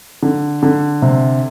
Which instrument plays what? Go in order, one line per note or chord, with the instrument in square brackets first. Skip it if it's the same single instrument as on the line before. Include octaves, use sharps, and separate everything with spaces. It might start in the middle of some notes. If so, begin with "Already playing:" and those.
[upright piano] D3
D3
C3